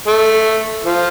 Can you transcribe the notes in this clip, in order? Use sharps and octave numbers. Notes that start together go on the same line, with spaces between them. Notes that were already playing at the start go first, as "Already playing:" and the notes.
A3
F3